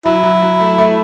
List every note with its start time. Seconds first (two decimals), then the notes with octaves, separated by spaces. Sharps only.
0.05 F#3 E4
0.23 F#3
0.42 F#3
0.60 A3
0.78 A3